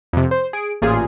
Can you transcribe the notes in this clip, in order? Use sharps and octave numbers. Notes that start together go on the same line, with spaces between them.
F2 C3
C5
G#4 D7
A1 A#2 F4 G#4